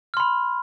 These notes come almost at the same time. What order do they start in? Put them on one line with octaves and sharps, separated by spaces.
F6 C6 B5